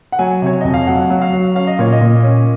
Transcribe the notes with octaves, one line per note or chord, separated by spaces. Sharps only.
F#5
F#3 G#5
C3 C#5
F2 D#5
F5
F#3 F#5
F#3
F5
F#3
C#4 F5
D#5
A#2 C#5
D#5
A#2
C#4